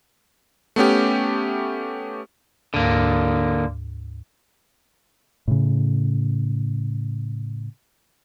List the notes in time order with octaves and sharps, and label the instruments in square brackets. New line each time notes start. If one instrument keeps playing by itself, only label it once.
[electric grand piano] A3 B3 C#4 G4
[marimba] D2 G#2 [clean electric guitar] D3 A#3
[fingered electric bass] A2 C#3